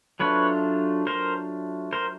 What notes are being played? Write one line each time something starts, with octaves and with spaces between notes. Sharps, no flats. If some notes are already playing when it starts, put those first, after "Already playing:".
F#3 A3 D4 F4 B4 C#5
A#4 C5
A#4 C5